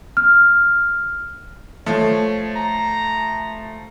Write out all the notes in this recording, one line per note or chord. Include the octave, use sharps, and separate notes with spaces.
F6
F3 A3 C#5
A#5